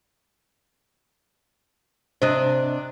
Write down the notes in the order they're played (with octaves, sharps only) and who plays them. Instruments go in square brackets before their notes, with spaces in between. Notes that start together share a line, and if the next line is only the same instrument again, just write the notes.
[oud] C3 D4 D#5 [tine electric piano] C5 F#6